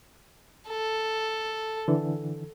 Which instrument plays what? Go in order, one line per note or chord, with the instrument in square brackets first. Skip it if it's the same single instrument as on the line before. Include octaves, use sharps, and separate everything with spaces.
[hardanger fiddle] A4
[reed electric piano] D3 E3